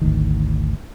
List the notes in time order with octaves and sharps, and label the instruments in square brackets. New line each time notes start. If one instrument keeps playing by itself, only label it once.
[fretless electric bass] G#1 D2 D#3